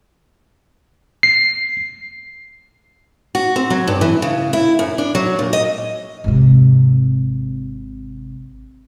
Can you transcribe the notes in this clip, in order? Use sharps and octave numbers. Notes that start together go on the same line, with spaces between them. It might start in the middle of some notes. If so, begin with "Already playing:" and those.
C7
F#4
C4
F#3
G2
E3
C#3
E4
F#2
D4
F#3
A#2
D#5
G#1 C3